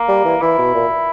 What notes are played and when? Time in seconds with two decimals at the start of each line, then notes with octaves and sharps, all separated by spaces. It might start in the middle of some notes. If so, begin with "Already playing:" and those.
Already playing: A#3
0.08 G3
0.25 E3
0.42 E3 E4
0.59 B2
0.74 A#2